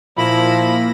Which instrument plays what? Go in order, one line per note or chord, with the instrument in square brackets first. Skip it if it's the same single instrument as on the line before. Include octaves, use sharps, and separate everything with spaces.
[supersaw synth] A#2 A#3 A#6 [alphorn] F3 [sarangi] E4 [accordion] B5